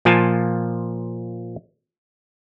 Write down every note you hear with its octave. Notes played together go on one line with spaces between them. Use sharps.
A#2 F3 F4 G#5 A5